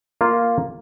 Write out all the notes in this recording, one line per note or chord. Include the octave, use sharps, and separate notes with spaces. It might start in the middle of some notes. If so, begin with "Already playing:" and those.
A#3 F4